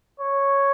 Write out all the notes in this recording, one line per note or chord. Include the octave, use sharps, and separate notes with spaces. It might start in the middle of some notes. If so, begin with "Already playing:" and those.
C#5